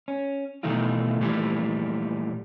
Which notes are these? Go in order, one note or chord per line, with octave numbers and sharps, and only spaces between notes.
C#4
B2 D#3 E3 A3 D#4 F4
A#2 E3 F3 G3 A3